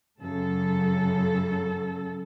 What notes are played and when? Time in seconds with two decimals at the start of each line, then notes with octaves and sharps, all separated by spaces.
0.21 F#2 C#3 A4